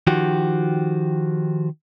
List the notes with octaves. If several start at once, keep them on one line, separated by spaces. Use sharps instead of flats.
D#3 F3 F#4 G4